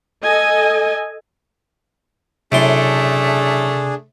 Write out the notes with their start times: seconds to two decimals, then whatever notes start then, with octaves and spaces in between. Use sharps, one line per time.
0.23 A4 D#5 G#5
2.52 F#2 A2 C3 A3 D4 G#4 C6